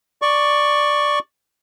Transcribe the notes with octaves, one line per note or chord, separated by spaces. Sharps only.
D5 C#6